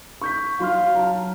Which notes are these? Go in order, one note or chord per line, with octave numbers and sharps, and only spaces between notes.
C#6 G6 B6
F#3 F4 F#4 F5 C6 F6
A5 A#5